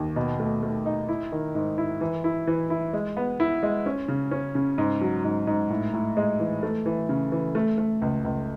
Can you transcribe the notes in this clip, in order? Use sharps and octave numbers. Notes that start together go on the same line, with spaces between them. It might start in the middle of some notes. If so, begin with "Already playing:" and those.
Already playing: D#2
B2
A3
A3
D#4
E4
D#3
G#2
E4
E3
E4
E3
E4
G#3
B3
E4
G#3
C#4
C#3
C#4
C#3
G#2
F#3
G#2
G#2
A2
A2
G#3
E3
A3
E3
C#3
E3
A3
A3
C#2
C#2